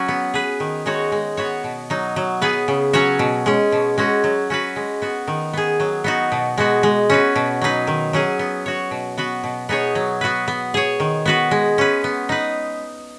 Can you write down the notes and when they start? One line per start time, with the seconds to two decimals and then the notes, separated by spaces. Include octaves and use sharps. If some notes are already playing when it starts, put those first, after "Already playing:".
Already playing: F#3 C#4 F#4
0.08 B3
0.34 G#4 B4
0.60 D#3
0.86 G#3 D#4 F#4 C#5
1.12 G#3
1.37 B3 F#4 C#5
1.64 B2
1.90 F#3 D#4
2.16 F#3
2.41 B3 G#4 B4
2.68 C#3
2.93 F#3 C#4 F#4 C#5
3.19 B2
3.46 G#3 C#4
3.72 B2
3.98 G#3 C#4 F#4
4.24 F#3
4.50 C#4 F#4 B4
4.76 G#3
5.02 B3 F#4
5.28 D#3
5.53 B3 G#4
5.80 F#3
6.04 B3 D#4 F#4
6.32 B2
6.58 G#3 B3 F#4
6.83 G#3
7.10 C#4 F#4 B4
7.36 B2
7.61 F#3 D#4 B4
7.87 D#3
8.13 F#3 C#4 G#4
8.39 B3
8.66 F#4 C#5
8.91 B2
9.18 B3 F#4 B4
9.44 B2
9.69 B3 D#4 G#4 C#5
9.95 F#3
10.21 B3 F#4 B4
10.48 B3
10.74 G#4 C#5
11.00 D#3
11.25 B3 F#4 B4
11.51 G#3
11.78 C#4 B4
12.04 B3
12.29 D#4 B4